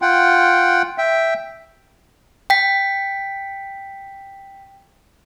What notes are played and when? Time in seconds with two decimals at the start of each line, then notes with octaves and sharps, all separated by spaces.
0.02 F4 F#5 G5
0.98 E5 G5
2.50 G5 B6